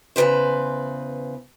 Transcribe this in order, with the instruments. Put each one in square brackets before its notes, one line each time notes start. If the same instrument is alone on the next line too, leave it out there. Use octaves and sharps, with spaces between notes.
[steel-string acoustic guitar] E2 C#3 F#3 B4 C5